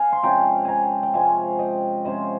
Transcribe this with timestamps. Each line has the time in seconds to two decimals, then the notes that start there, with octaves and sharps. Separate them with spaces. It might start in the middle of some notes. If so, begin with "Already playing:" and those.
Already playing: F5 G#5
0.12 C6
0.23 C3 F3 G#3 C#4 G5 A#5
0.65 G5 G#5 A#5
1.03 G5
1.13 C3 F3 G#3 C#4 F5 G#5
1.59 D#5 G5
2.05 C3 F3 G#3 C#4 C5 D#5